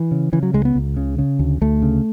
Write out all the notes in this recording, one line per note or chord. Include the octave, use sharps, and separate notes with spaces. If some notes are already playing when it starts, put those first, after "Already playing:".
Already playing: E3
C#3
C#3 E3
F#3
C#2 G#3
B3
C#2
C#3
C#3
D2
D2 A3
C#3